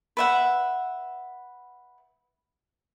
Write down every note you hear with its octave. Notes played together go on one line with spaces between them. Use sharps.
B4 E5 F#5